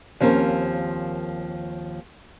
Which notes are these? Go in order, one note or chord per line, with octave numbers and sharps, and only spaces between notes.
D#2 F3 C4 C#4 A#4